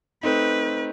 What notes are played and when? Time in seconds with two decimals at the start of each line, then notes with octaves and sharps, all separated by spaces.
0.23 A3 C4 D#4 B4